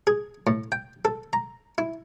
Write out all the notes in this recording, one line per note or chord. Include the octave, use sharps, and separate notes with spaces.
G#4
A2
G5
A4
A#5
E4